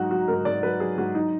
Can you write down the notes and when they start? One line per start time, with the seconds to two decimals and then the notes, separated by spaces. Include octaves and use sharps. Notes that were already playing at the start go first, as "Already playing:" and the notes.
Already playing: G#2 F#3 D#4 F#4
0.11 F#3 F#4
0.28 G#2 A#4
0.45 G#2 D5
0.63 F#3 B4
0.80 F#3 G#4
0.98 G#2 F#4
1.15 F#3 D#4